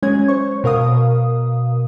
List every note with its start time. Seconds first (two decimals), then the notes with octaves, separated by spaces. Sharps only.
0.02 F#3 G#3 C#4 G#4 C#5 G#6
0.28 C5 C#5 C#6
0.64 B2 A#4 F5 D#6